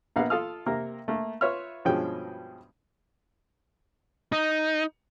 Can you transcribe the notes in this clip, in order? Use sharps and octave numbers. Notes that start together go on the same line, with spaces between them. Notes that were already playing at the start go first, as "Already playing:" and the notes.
A#1 A#3 B3 F5 F#5
F4 A4 F5 A5 D#6 F6
C3 A#3 A#4
A3 A#3
F4 B4 C#5 E5 C6 F6
G2 B2 F3 G#3 C#4 G5
D#4